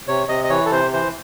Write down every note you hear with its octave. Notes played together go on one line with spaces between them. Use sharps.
C3 C#5
C3 D#5
D#5
E3 C#5
A4
C3 C5
E3 C5